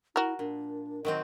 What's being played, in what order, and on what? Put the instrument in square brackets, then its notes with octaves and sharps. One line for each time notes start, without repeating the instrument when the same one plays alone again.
[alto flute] E4 [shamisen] F#4 A#4
[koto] A#2 [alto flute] D4
[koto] D#3 F#3 C4 [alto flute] D#5